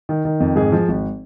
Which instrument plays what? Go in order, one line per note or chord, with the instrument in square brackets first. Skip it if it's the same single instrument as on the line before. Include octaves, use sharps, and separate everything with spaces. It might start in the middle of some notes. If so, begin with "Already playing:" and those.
[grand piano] D#3
D#3
F2
G#2 G#4
F3
G#1